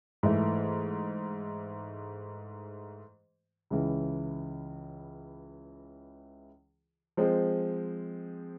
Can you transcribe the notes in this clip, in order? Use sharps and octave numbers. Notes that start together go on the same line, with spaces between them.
G#2 E3 A3
C#2 C#3 E3
F3 G#3 C4